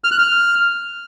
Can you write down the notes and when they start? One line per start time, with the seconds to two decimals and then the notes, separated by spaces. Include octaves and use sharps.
0.04 F6
0.11 F#6
0.19 F6